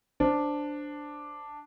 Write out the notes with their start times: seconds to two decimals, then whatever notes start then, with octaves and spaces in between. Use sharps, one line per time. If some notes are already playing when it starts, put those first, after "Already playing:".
0.20 G#1 D4 C5